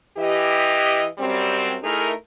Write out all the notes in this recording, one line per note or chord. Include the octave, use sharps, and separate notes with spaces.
E3 G4 D#5
F#2 G3 C4
A3 D#4 E4 G#4 A#4